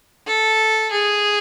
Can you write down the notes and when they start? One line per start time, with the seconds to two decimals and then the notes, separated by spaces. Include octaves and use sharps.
0.27 A4
0.92 G#4